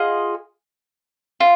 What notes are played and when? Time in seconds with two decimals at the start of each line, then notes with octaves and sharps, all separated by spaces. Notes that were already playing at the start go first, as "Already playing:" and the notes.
Already playing: F4 G#4 D#5 F#5
1.40 F4